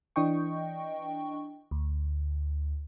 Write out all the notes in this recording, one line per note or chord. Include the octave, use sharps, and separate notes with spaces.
E3 D4 D#5 G5 C#6
D2